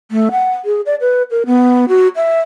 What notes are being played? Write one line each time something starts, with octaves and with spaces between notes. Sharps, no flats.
A3
F#5
G#4
D5
B4
A#4
B3
F#4
E5